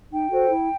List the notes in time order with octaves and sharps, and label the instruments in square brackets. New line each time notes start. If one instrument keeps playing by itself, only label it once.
[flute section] D#4 G5
F#4 A4 C5
E4